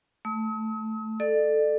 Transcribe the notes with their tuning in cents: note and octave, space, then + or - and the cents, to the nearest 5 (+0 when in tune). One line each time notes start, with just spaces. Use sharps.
A3 +0 D#6 +45
A4 +0 D5 +35